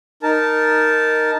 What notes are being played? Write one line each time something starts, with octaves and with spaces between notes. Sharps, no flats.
D#4 A#4 A5